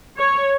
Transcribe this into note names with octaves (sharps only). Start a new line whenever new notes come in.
C#5